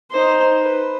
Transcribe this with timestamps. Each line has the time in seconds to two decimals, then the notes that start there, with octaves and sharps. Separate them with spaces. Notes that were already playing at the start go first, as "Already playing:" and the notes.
0.11 D#4 C5
0.62 B4